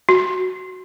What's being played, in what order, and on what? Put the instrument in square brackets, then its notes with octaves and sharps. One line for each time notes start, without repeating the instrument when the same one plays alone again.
[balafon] F#4